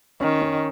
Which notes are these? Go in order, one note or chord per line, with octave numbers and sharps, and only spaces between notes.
D#3 C#4
C#4